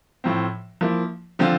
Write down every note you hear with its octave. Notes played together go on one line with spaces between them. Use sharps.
A2 F3 C4
F3 A#3 E4
D3 F3 C4 F4